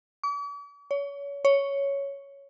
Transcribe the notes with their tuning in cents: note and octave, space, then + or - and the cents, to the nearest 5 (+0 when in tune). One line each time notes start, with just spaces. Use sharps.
D6 -45
C#5 +30
C#5 +5